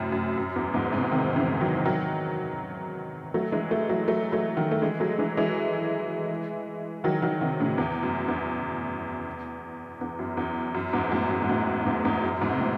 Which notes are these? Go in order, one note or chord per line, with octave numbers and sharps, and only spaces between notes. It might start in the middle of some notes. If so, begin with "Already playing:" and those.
Already playing: F#2 A2 C3
F#2
F#2
E2
E2 G#2
G#2 C3
C3 D#3
C#3 E3
D#3 F#3
D#3 F#3
F#3 A3
E3 G#3
F#3 A3
F#3 A3
F#3 A3
F#3 A3
D#3 F#3
A3
E3 G#3
F#3 A3
E3 G#3
E3 G#3
D#3 F#3
D#3 F#3
C3 D#3
A2 C#3
E2
F#2
E2
E2
F#2
E2
F#2
E2 G#2
F#2 A2
F#2
G#2
F#2 A2
E2 G#2
E2 G#2
F#2
E2 G#2
C3
A2